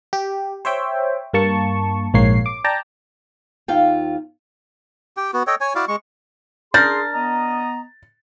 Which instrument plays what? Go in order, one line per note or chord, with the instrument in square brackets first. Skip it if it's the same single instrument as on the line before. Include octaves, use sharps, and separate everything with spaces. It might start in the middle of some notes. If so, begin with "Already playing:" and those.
[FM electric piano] G4
C5 C#5 E5 G5
G2 A#3 A5 C#6
A#1 G#2 A#3 C#5 C7
D6
D5 G5 A5 A#5
[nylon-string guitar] D#2 F4 F5 G5
[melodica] G4 G5
B3 F#4
A4 C#5 D#5 G5
C#5 G#5
E4 F#4 D5 F5
G#3 C#6
[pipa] D4 A#4 [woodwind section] G#4 C6 [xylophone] G6 [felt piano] A6
[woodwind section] B3 D#5 A#5